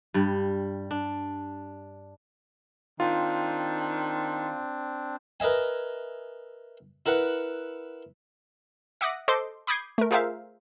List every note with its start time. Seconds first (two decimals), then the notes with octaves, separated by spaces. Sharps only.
0.14 G2 G3
0.91 D4
3.00 D#3 C4 D4 F4
5.40 A#4 B4 D#5 E5 G#5
7.06 E4 A#4 B4 F#5 B5
9.01 E5 F#5 D6 D#6 F#6 A#6
9.28 A4 C5 D#5 C6 D6
9.67 B5 D6 D#6 G6 G#6 C7
9.98 A3 A#4
10.11 F4 G#4 A#4 C5 E5 F5